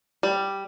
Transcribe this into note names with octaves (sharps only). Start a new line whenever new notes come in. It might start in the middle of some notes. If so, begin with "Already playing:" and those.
G3